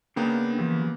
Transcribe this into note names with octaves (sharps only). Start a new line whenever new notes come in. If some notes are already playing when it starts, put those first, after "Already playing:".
C#3 A#3 B3 D4 G5 A#5
E3 F3 G4